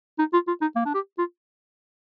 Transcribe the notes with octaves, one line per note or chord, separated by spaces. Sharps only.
D#4
F4
F4
D#4
A#3
D4
G4
F4